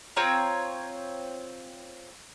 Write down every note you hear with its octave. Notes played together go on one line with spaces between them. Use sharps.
C4 F4 C#5 A#5